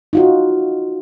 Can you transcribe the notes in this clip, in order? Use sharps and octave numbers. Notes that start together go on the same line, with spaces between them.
D#4 F4 F#4